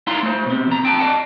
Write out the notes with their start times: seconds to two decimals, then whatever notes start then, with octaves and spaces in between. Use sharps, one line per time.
0.07 D#4 E4 E5 F5 A#5 C6
0.23 A3 C5
0.46 B2 C4
0.67 E2 A#5
0.83 C4 G5 A5
0.99 D5 D#5 F5 F#5 A5